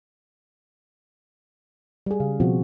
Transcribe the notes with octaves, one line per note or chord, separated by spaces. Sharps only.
G3 G#4
C#3 F5
B2 F3 C4 F4 F#4